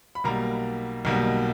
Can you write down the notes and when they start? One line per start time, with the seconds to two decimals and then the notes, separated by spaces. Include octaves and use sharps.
0.15 B5
0.24 B1 B2 G3 A#3 A#5
1.05 B1 B2 G3 A#3